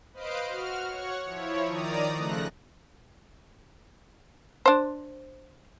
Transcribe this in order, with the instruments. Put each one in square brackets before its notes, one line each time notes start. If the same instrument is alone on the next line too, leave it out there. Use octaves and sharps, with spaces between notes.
[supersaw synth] B4 C5 D#5 F5 C7 D7
F#4 F6
C#5 F#5 C#6
F3 E4 C#5
D#3 D5 A#5 D#6
C#3 F3 A3 F#6 A#6
[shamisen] D4 C5